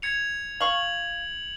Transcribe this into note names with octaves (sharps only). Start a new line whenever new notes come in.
G#6 C#7 F7
F5 C#6 F#7